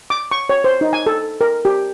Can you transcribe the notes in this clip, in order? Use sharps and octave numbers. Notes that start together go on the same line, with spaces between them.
D6
C#6
C#5
C5
D#4
G#5
A4
A#4
G4